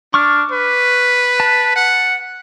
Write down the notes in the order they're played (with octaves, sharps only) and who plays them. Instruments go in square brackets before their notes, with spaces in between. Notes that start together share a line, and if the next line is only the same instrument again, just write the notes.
[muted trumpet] D4 [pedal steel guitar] C#6 D6 F6
[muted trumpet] B4
[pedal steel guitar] A5
[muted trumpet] F#5